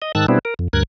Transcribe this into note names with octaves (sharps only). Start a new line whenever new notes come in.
D#5
G#2 D#3 A5 E6 F#6
B2 G3 B3 C4 D4 E4
A#4
F2
D2 G2 A#4 F#6 G#6